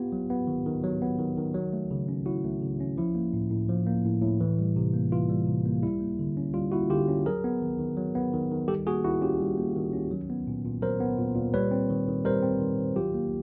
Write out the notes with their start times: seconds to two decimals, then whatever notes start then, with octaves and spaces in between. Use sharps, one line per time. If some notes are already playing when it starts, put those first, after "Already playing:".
Already playing: B3 F4 G4
0.12 F#3
0.30 B3
0.47 D#3
0.66 D#3
0.84 F#3
1.02 B3
1.19 D#3
1.38 D#3
1.54 F#3
1.73 A3
1.91 C#3
2.08 C#4
2.26 F#3 E4 F#4
2.44 A3
2.62 C#3
2.80 C#4
2.98 F3 E4
3.15 A#3
3.33 A2
3.51 A2
3.69 F3
3.86 A#3
4.05 A2
4.22 A2
4.40 E3
4.59 G3
4.76 C3
4.93 A#3
5.12 E3 F4
5.29 G3
5.47 C3
5.65 A#3
5.83 G3 E4
6.00 A#3
6.19 D3
6.37 C#4
6.54 G3 F4
6.72 A#3 E4 F#4
6.90 D3 F4 G4
7.09 C#4
7.26 F#3 G#4 A#4
7.44 B3
7.62 D#3
7.79 D#3
7.97 F#3
8.15 B3
8.33 D#3
8.51 D#3
8.68 G3 G4 A4
8.87 A#3 F#4 G#4
9.04 D#3 E4 F#4
9.21 C#4 F4 G4
9.40 G3
9.58 A#3
9.76 D#3
9.93 C#4
10.11 F#3
10.30 B3
10.47 A#2
10.65 A#2
10.82 F#3 A#4 C5
11.00 B3
11.18 A#2
11.36 A#2
11.54 G3 B4 C#5
11.71 C4
11.90 D#3
12.08 D#3
12.25 G3 A#4 C5
12.43 C4
12.60 D#3
12.79 D#3
12.96 F#3 F4 G4
13.14 A#3